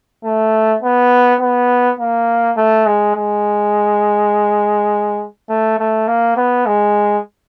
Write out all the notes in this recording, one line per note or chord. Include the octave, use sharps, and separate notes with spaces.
A3
B3
B3
A#3
A3
G#3
G#3
A3
A3
A#3
B3
G#3